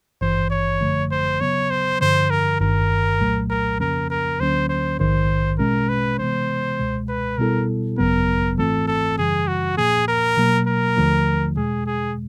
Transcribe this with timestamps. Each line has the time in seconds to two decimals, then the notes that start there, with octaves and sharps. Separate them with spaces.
0.21 G#1 G2 E3 C5
0.51 C#5
0.81 F#2 D3 F3 A3
1.11 C5
1.41 C#3 F#3 B3 C#5
1.70 C5
2.00 G2 D3 F3 C5
2.30 A#4
2.60 G1 G2 D#3 A#4
3.20 C2 A#2 F#3 A3
3.50 A#4
3.80 F2 C#3 F3 A#3 C#4 A#4
4.10 A#4
4.40 D2 D3 F#3 A#3 C#4 C5
4.69 C5
4.99 A#1 G#2 D#3 C5
5.59 B2 G#3 C#4 A#4
5.89 B4
6.19 C3 E3 G#3 B3 C5
6.79 C#2 B2 G#3
7.09 B4
7.38 B2 G3 B3 E4 A4 A#4
7.98 G#1 F#2 C#3 F#3 B3 A#4
8.58 G#2 E3 A3 C4 F4 A4
8.87 A4
9.18 F#2 C#3 E3 G3 G#4
9.48 F#4
9.78 A#2 F3 A#3 G#4
10.08 A#4
10.37 B2 F#3 A#3
10.67 A#4
10.97 D#2 D3 F3 A3
11.57 E2 B2 G#3 G#4
11.87 G#4